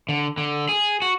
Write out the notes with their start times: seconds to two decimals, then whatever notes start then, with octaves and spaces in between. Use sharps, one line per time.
0.09 D3
0.37 D3
0.69 G#4
1.02 F#4